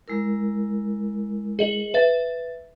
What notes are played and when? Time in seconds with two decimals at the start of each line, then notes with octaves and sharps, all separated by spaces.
0.08 G#3 E4 A#4
1.59 G#4 D#5 F#7
1.94 B4 E5 A6